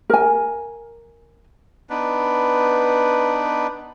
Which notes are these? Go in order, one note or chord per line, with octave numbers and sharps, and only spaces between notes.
A#4 G#5
B3 D4 D#4 B4